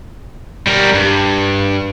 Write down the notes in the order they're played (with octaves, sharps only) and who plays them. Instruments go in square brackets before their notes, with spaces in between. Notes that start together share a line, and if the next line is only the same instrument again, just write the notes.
[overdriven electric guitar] G3 A#4
G2